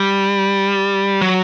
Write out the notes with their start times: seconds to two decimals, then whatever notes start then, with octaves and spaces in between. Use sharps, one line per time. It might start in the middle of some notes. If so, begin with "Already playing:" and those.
Already playing: G3
1.22 F#3